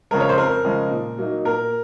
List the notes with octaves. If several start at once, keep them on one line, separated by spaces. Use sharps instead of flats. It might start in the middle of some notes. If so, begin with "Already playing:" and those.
C#3 F3 G#3 A#4
C#5
C5
F2 A#4
C#3 F3 G#3
A#2
F#3 A#3 D#4
A#2 A#4